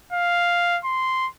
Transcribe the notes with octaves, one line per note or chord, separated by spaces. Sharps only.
F5
C6